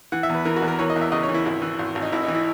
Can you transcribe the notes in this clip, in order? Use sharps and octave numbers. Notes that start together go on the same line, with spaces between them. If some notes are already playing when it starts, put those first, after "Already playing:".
E3 F#5
E5
E2
B4
E3 A#4
F#4
E2
A#4
E3 C#5
D#5
E2
E5
C#3 D#5
C#5
E3
E4
G#1 E4
E3
G#1
G#1
D#4
G#1 E4
E3 D#4
E4